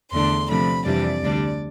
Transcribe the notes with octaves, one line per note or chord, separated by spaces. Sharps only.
E2 D3 A3 D4 C6
C3 F3 A3 D4 B5
F2 C3 E3 G3 D4 D5
D2 D3 G3 D4